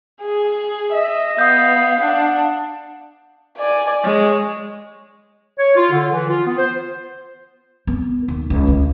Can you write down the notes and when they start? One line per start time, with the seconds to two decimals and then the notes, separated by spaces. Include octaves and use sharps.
0.21 G#4
0.93 D#5 E5
1.38 B3 F5 D#6 G6
2.01 D4 F#5
3.58 D5 G#5
4.04 G#3 C#5
5.58 C#5
5.76 F4
5.91 D3
6.12 E3
6.29 F4
6.46 B3
6.57 C5
7.87 B3
8.28 D#2
8.50 C#2
8.67 D2